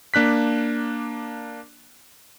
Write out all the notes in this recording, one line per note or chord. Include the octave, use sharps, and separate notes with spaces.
A#3 D4 F#6 B6